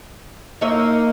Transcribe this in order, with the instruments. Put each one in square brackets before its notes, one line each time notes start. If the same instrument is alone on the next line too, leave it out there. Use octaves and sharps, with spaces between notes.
[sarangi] A#3 [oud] D#4 C#5 E5